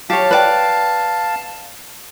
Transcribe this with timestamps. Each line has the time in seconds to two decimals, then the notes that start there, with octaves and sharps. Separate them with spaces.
0.10 G4 C#5 F5 A5
0.31 B4 D5 G5